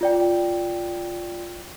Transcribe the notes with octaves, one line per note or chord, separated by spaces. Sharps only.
F4 D5 G5